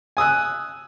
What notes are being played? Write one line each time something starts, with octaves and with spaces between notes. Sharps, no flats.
G#5 D#6 E6 F#6